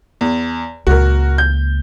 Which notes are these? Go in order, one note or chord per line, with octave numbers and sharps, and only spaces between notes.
E2
C#2 A#2 F#4 A#4
G6